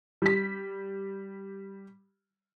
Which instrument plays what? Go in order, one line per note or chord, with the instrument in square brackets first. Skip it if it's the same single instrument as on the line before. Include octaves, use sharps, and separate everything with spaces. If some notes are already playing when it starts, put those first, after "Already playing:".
[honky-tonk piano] G3 B6